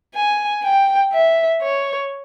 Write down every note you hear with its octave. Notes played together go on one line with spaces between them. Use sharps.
G#5
G5
E5
C#5